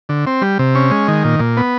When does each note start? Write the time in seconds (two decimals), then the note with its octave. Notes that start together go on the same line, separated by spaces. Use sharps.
0.09 D3
0.27 C4
0.42 G3
0.59 C3
0.75 C#4
0.91 G#3
1.08 D#3
1.24 A#2
1.40 A#2
1.57 B3